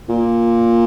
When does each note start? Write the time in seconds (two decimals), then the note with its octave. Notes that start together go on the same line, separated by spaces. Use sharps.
0.09 A#2